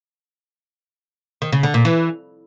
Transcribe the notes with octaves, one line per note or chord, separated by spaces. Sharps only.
D#3
C#3
D3
A#2
E3